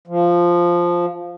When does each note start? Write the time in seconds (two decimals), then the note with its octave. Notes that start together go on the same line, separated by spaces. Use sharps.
0.07 F3